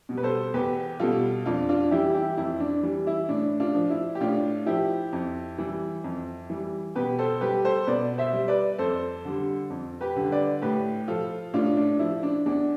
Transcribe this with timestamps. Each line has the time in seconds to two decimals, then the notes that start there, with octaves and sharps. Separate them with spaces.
0.09 B2 G3
0.17 B4
0.23 A4 C5
0.54 E2 G4 B4
1.00 B2 G3 F4 A4
1.46 F2 D4 F4
1.69 D4 F4
1.91 E3 G3 E4 G4
2.15 E4 G4
2.37 F2 E4
2.60 D4
2.83 E3 G3
3.07 E4
3.29 A2 D4
3.60 D4 F4
3.75 F3
3.90 E4
4.15 G4
4.21 A2 D4 F4
4.66 F3 E4 G4
5.12 F2
5.58 E3 G3
6.04 F2
6.50 E3 G3
6.95 B2 G4 B4
7.19 A4 C5
7.41 G3 G4 B4
7.65 A4 C5
7.87 B2 B4 D5
8.18 C5 E5
8.33 G3
8.48 B4 D5
8.78 F2 A4 C5
9.25 D3 G3
9.70 F2
10.01 G4 B4
10.16 D3 G3
10.32 B4 D5
10.62 A2 G4 B4
11.08 F3 F4 A4
11.53 A2 D4 F4
11.77 D4
11.99 F3 E4
12.23 D4
12.46 E2 D4